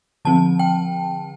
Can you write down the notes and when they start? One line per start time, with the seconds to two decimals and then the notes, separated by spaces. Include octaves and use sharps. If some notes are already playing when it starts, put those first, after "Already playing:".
0.25 D3 F3 C4 A5
0.59 G5